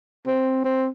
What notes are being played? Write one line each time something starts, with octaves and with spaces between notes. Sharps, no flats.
C4
C4